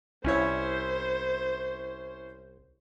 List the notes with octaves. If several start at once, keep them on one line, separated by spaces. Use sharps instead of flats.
C2 C#4 E4 C5 C#5